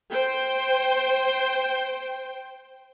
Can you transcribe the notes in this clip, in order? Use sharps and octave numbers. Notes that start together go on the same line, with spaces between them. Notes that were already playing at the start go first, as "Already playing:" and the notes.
C5 G5